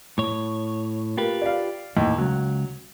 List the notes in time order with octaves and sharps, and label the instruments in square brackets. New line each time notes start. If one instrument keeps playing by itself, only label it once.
[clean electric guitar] A2 C#5
[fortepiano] A#3 [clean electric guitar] F4 G4 B4
[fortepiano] D5 F5
[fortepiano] D#2 [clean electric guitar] A2
[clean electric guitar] C#2 [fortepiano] F#3